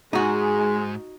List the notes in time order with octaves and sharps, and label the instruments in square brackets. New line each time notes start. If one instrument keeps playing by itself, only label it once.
[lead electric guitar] G#2 [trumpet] G#3 [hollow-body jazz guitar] D#4 F#4 [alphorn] G#4